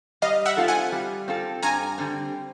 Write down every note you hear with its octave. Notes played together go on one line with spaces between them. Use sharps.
G3 D#5 F5
E5 F#5
C4 F4 A4
F#5 G#5
G3
C4 F4 A4
G2 G#5 A#5
D3 G3 C4